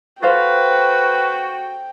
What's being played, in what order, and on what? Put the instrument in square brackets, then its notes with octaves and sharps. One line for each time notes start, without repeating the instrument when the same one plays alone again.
[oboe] F#4 [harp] A4 C5 F5 [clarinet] B4 [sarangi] G5